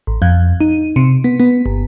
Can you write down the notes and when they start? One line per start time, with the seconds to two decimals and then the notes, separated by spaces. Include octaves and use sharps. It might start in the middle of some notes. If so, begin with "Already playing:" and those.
0.07 A1
0.22 F2
0.60 D#4
0.96 C3
1.24 B3
1.40 B3
1.66 G1